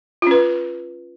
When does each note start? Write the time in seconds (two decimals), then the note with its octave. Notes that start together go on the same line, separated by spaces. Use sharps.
0.22 F4
0.27 C#4
0.31 B4